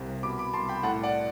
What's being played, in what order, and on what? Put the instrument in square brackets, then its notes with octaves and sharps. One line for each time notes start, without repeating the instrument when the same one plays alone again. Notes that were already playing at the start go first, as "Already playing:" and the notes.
Already playing: [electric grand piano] C2 C3
B2 B5 D6
B5 D6
C2 A5 C6
G5 B5
A2 F#5 A5
D5 F#5